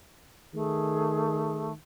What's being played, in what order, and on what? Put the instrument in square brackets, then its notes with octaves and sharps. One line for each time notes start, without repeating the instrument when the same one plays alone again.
[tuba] D#3 [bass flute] A3 [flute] G#4